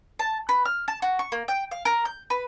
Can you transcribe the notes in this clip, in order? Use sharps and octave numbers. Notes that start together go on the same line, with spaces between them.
A5
B4
F6
A5
F#4
C#6
A#3
G5
F5
A#4
G6
B4